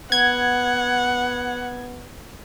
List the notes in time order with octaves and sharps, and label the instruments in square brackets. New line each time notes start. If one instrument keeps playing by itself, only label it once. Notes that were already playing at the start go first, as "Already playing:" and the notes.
[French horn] B3 [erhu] F#5 [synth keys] G#6